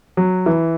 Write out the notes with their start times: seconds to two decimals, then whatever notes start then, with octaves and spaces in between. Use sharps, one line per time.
0.17 F#3
0.46 E3